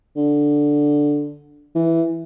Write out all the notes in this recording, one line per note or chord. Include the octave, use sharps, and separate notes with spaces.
D3
E3